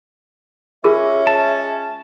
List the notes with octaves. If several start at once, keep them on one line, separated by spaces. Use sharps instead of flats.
G#3 C#4 F4 G#4 A#4 E5
A5